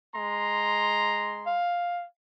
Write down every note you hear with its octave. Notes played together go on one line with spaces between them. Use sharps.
G#3 A#5 C6
F5